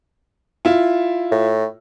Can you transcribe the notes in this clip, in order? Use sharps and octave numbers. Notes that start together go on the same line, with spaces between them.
E4 F4
A2